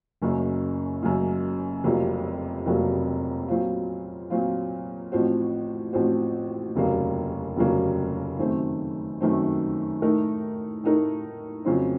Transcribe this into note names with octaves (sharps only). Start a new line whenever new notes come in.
F#1 F#2 C#3
F#1 F#2 C#3
F1 F2 C3 F#3 A#3
F1 F2 C3 F#3 A#3
A#2 F#3 C4 F4
A#2 F#3 C4 F4
A1 A2 F3 C4 F#4
A1 A2 F3 C4 F#4
F1 D#2 C#3 F#3 A#3
F1 D#2 C#3 F#3 A#3
F#2 D#3 A3 C4
F#2 D#3 A3 C4
A2 A3 D#4 A#4
A2 A3 D#4 A#4
F2 C#3 F#3 C4